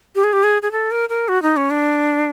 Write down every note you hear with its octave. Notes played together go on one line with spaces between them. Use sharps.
G4
G#4
G4
G#4
G#4
A4
A#4
A#4
F#4
D#4
C#4
D4